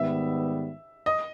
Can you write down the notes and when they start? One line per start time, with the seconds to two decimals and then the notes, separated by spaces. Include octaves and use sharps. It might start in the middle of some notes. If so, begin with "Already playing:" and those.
Already playing: G#2 D#3 G3 B3 E5
1.06 D#5